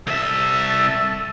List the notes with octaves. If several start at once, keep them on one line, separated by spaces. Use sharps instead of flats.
C2 A4 E5